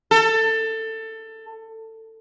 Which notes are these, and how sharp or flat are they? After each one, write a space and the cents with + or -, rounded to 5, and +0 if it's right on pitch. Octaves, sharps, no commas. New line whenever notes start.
A4 +20